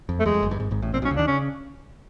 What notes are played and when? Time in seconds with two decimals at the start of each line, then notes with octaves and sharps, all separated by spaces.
0.09 F2
0.20 A3
0.25 E2 G#3
0.34 F2
0.42 F#1 F#2
0.51 G1 G2
0.60 G#1 G#2
0.71 G#1 G#2
0.82 A1 A2
0.93 A#1 A#2 C4
1.02 B1 B2
1.05 C#4
1.10 C#2 C#3
1.16 D#2 D#3 D4
1.27 C#3 C#4